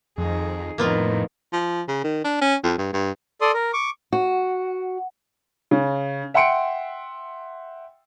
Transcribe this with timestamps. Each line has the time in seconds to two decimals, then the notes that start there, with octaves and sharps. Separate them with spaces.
0.18 F2 D#3 G#4
0.78 F2 A2 D#3 A#3 B3 F4
1.52 F3
1.88 C#3
2.04 D#3
2.24 D4
2.41 C#4
2.63 F2
2.78 G2
2.93 G2
3.41 A4 D5 C6 D#6
3.54 A#4
3.73 C#6 D6
4.13 F#4
5.71 C#3
6.34 E5 F#5 G5 C6 C#7 D7